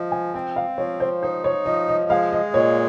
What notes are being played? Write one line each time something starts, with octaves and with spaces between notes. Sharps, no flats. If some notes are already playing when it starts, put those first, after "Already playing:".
Already playing: F3 D#5
G#5
C4 G5
F5
F3 C#5
C5
D#4 C5
C#5
F3 D#5
D#5
G#3 F5
D#5
A#2 C#5